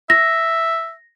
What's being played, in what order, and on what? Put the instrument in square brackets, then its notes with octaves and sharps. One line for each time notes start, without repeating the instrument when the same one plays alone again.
[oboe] E5 [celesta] A#6